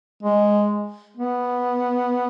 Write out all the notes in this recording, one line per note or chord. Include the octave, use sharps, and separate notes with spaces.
G#3
B3